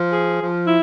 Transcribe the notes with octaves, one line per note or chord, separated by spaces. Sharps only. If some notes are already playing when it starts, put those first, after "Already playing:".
Already playing: F3
G#4
F3
E4